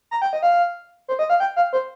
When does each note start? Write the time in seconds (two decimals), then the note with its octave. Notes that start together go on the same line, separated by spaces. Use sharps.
0.11 A#5
0.22 G5
0.33 D#5
0.43 F5
1.08 C5
1.19 D#5
1.30 F5
1.40 G5
1.56 F5
1.73 C5